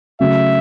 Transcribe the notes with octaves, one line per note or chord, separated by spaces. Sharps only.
C#3 F#3 A3 E5